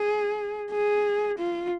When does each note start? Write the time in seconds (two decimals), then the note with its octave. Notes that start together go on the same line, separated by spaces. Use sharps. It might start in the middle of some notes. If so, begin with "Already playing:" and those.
Already playing: G#4
0.71 G#4
1.38 F4